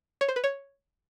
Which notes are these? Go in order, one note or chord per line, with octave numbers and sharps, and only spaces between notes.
C#5
C5
B4
C#5